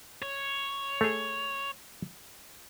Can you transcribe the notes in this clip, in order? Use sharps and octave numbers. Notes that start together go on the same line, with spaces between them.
C#5
A3 G#4